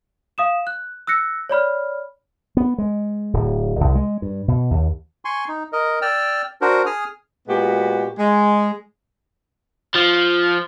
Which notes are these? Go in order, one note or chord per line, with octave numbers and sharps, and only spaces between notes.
F5 D#6 E7
F#6
E6 F#6 A#6 C#7
C#5 D5 B5 F6
B3
G#3
D1
C2
G#3
G2
B2
D#2
G#5 C6 C#6
D#4
A#4 D#5
D5 G5 E6 F6
D4 F#4 A#4 C5
G#4 D#6 F6
A#2 G#3 B3 F#4 G4
G#3
F3